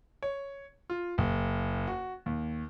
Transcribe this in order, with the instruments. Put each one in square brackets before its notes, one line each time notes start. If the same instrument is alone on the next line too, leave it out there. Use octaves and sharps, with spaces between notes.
[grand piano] C#5
F4
F#1
F#4
D#2